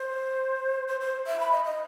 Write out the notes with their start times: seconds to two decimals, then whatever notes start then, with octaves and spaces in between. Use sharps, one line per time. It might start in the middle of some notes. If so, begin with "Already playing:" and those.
Already playing: C5
0.88 C5
1.01 C5
1.27 E5
1.40 B5
1.52 D#5
1.64 D#5